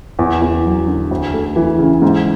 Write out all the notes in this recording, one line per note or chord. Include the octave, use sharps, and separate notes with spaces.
E2
E2
F#3
D3
D2
A3
E3
C#3
G#2